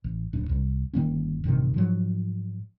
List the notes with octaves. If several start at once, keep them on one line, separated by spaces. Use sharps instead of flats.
A1
D1 D4
C2
G1 D#3 A#3 C#4
A1 G2 C3 D#3
G#2 F3 F#3